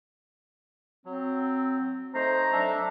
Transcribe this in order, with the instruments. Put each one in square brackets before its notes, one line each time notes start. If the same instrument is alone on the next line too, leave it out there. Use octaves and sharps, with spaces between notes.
[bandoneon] F#3 [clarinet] C4
[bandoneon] A3 D#4 [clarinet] C5 [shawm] A#5
[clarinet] F#3 [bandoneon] D4 A4 E5